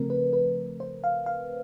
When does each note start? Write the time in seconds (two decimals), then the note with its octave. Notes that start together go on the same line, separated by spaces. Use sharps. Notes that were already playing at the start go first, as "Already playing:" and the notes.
Already playing: C#3 F3 A3 C4 A#4
0.10 B4
0.33 B4
0.80 C5
1.04 F5
1.26 F5